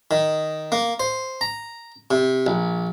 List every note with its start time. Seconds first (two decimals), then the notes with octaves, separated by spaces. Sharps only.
0.11 D#3
0.72 A#3
1.00 C5
1.41 A#5
2.11 C3
2.47 A#1